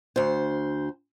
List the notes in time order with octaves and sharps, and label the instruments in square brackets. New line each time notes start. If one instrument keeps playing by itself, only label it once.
[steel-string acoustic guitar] D2 C5